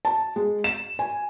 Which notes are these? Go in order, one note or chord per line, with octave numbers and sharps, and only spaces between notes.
A5
G#3
E7
G#5